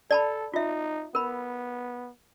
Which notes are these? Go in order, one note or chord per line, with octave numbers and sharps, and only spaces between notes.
A4 D5 A5 B5
D#4 F4 E5
B3 A#4 B5